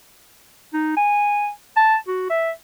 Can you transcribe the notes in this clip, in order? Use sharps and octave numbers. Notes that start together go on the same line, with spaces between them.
D#4
G#5
A5
F#4
E5